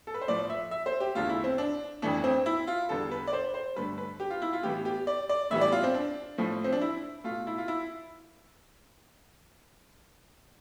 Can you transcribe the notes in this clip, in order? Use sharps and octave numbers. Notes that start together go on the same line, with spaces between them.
A4
B4
C5
A2 F3 A3 D5
E5
E5
C5
G4
E2 D3 A3 F4
E4
C4
D4
F2 E3 A3 D4
C4
E4
F4
E2 D3 G3 B3 A4
B4
D5
C5
C5
G2 D3 A3 B4
B4
G4
F4
E4
F4
A2 E3 B3 G4
G4
D5
D5
A2 E3 G3 B3 E5
D5
F4
C4
D4
A2 F3 A3
C4
D4
E4
B2 A3 F4
E4
F4
E4